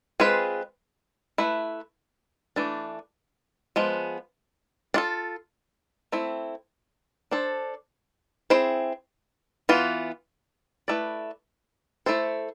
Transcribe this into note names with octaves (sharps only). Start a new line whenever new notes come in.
G#3 C4 F4 G#4 B4
A3 E4 B4
E3 A3 D4
F3 G#3 B3
D4 F4 A4
A3 C4 E4
D4 A4 C5
C4 E4 G#4 C5
E3 B3 F4
A3 E4 B4 D5
A3 E4 A4 C5